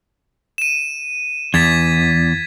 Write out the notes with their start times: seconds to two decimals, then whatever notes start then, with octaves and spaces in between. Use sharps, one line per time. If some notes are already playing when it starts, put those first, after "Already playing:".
0.58 D#7 E7
1.54 E2 G#6 A6 B6